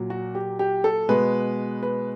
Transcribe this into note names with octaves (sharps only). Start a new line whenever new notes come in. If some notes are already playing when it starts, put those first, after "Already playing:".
Already playing: A#2 F#3
F#4
G4
G4
A4
B2 G#3 B4
B4